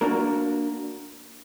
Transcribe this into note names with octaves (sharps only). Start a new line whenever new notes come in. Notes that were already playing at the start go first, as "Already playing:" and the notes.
A#3 D4 F#4 A#4